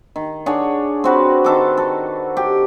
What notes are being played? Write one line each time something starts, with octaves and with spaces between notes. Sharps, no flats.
D#3
D4 G#4 C#5 F#5
C4 F#4 B4
D#3 A4 D6
A4
G4